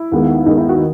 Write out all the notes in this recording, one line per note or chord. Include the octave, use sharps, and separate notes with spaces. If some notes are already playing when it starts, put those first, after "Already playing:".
Already playing: E4
D#2 D#3 G#3 B3
D#2 D#3 G#3 B3 D#4
E4
F#4